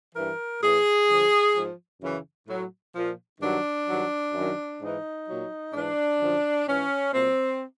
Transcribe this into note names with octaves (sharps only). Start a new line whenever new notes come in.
G2 E3 A#4
A2 E3 G#4
G2 D3 F3
G#2 F3
F#2 C#3 E3
A2 F#3
A#2 F3
G2 D#3 F#3 D4
G2 D#3 F#3
F#2 D#3 F#3
G#2 E3 D#4
A#2 F#3
G#2 E3 D4
F#2 D3 F3
G#2 E3 C#4
A#2 F#3 C4